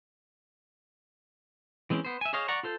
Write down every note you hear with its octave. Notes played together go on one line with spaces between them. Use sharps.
E3 G#3 C4 C#4
B3 C5
E5 G#5
G#4 C5 C#5 D#5 F5
D5 F#5 A#5 C#6
F4 A4 C5